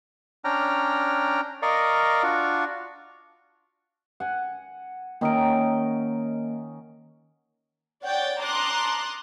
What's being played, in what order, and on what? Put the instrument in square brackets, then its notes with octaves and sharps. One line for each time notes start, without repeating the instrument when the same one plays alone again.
[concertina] C#4 D4 G5 A#5 F6
A#4 D5 D#5 F5 A#5 C#6
D4 F4 F#4 C#6
[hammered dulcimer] F#5 G#5
[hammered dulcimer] D#3 C#4 D#5 [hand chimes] A#3 A#5 D7
[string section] C#5 D5 F#5 G5 G6 A6
A5 A#5 C6 D6 D#6 F#6